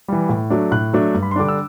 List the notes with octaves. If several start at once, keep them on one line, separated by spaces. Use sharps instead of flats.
E3 G3
A2
F#3 A3 D4
A2 F#6
F#3 A3 D4
G2
B5
C6
D3 G3 D4 D6
E6